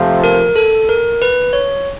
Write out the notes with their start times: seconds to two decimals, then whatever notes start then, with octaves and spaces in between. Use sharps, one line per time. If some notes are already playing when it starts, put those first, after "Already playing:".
Already playing: C3 F3 A3
0.24 A#4
0.56 A4
0.89 A#4
1.22 B4
1.53 C#5